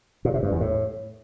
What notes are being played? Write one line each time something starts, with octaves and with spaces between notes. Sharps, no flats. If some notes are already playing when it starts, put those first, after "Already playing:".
A#2
C3
G2
E2
A2